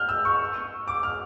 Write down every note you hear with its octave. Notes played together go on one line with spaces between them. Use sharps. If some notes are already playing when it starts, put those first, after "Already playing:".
Already playing: F6 G6
E6
C#6
D6
F6